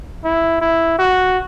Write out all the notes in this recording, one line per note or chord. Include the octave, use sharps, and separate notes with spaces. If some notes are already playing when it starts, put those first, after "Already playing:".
E4
E4
F#4